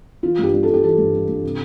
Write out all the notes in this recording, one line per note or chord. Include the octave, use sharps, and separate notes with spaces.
E3 F4
G2 G4
G3
A4
G2
G4
E3 A4
G2
G3
G2
C3